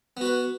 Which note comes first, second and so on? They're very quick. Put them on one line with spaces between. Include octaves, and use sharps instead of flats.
B3 F#4 B4